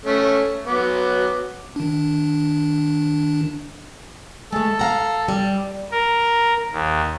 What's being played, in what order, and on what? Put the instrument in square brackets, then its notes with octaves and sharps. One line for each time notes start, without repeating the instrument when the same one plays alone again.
[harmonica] A3 C#4
F#3 B3 D6
[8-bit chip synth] D#3 D4
[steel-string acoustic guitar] G#3 A3 [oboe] A4
[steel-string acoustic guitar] F5 F#5 A#5
G3
[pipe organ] A#4
D#2